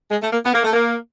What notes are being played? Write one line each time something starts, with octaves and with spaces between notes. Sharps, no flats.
G#3
A3
A#3
B3
A#3
A3
A#3